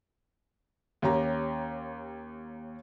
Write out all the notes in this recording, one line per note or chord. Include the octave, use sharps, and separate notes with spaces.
D#2 C#4 G4 A#5